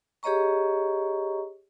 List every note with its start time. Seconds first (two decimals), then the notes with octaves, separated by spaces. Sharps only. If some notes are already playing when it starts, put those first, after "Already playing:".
0.23 G4 G#4 C#5 D#5 A#5 C#6